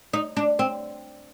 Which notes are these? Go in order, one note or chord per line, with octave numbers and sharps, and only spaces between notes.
D#4
D4
C4